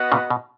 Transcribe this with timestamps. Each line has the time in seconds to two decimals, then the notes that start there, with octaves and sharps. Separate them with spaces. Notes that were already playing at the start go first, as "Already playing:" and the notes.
Already playing: B3 F#4 B4 D#5 F#5
0.12 A#2 C#3
0.30 B2